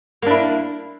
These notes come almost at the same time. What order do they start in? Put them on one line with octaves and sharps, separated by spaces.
A#3 D4 E4